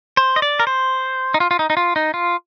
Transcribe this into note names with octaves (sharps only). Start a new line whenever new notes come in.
C5
D#5
D5
A#4
C5
D#4
F4
F4
D#4
D#4
F4
D#4
F4